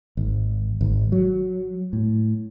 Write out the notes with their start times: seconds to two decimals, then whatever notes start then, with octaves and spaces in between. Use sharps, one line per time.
0.17 G#1
0.81 G#1
1.12 F#3
1.93 A2